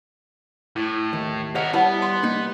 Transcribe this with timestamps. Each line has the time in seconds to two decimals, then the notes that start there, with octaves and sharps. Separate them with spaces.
0.76 A2 E4
1.13 D#2
1.55 E4 A#4 C#5 D#5 F#5
1.73 G3 B3 E4 B4 C#5 F#5 A5
2.02 C6
2.23 C2 A#3 D#4